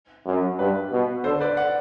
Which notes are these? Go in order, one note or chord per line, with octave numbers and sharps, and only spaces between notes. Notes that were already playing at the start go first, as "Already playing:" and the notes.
F#2
G2 B4
B2
D3 A4 C5
B4 D5
D5 F#5